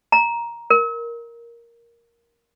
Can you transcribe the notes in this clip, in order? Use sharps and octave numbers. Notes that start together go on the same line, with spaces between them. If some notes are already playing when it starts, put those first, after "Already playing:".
A#5
A#4